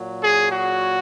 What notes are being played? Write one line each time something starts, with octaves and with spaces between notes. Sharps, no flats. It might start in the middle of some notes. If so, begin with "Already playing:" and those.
Already playing: A#2 F#3
G#4
F#4